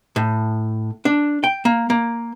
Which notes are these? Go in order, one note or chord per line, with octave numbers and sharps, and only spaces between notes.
A2
D4
G5
A#3
A#3